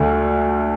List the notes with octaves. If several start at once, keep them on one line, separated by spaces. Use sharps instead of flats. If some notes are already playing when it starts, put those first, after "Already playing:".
Already playing: D2 D3 A3